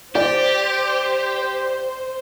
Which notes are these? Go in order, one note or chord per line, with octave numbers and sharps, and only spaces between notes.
G4 C5 D5